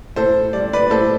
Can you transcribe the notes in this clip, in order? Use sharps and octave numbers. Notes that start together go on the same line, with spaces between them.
A2 A4 C5
G3 D5
B4 D5
A2 A4 C5